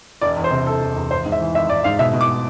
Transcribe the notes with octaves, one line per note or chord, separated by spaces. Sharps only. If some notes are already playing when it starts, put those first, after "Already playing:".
E1 D5
E2
C5
C3
E1 A4
E1
E2
G#1 C5
G#2
E5
E3
G#1 E5
G#1 D5
G#2 F5
B2 E5
B2
D6